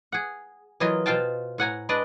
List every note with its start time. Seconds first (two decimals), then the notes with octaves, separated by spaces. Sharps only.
0.12 G#4 F#5
0.80 E3 F#3 F4 A#4 D#5
1.06 B2 F4 C5 F5 G5 A5
1.58 A2 F#5 G#5 A#5
1.89 G#3 D4 B4 D5 D#5